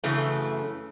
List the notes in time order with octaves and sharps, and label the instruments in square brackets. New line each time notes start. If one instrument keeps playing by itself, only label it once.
[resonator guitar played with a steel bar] F#2 C#3 E3 A3